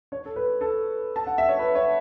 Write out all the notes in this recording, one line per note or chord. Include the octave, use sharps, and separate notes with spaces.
C#5
A4
B4
A4
A5
F#5
E5
C#5
B4
C#5